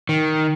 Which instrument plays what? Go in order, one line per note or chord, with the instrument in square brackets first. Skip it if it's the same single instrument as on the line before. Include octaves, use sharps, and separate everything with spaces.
[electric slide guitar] D#3